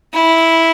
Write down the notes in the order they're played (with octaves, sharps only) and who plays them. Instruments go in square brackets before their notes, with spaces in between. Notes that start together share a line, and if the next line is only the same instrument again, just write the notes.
[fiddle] E4